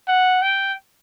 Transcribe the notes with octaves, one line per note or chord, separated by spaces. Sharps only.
F#5
G5